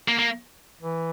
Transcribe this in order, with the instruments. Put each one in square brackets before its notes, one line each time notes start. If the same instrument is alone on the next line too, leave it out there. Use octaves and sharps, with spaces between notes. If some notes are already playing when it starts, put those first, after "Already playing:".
[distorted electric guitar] A#3
A#3
[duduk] E3